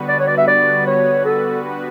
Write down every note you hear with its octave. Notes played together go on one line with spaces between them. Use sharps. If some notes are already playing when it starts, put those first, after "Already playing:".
Already playing: D3 G3 B3 F#4 B4
D5
C#5
D5
E5
D5
C#5
A4